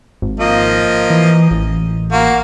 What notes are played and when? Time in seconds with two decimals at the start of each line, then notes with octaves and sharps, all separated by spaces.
0.22 G#1
0.40 F3 A#3 D#5
1.10 E3
1.51 A1
2.12 A#3 F#4